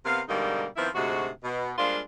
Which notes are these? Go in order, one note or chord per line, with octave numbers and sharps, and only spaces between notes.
C3 B3 A#4 F5
G#2 B2 D3 G3 A#3 D#4
D#3 F3 B3 C4 E4
D2 G#2 C3 G#3 F#4
B2
G3 G#3 A#3 D4 F4 C5